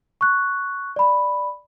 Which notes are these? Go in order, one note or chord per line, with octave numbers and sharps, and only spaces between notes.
C#6 F#6
D5 B5